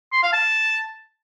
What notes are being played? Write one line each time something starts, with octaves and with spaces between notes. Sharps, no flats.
C6
F5
A5